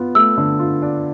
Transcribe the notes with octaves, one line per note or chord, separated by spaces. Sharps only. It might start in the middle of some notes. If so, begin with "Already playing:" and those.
Already playing: B3 F4
A3 E6
D3
F4
D4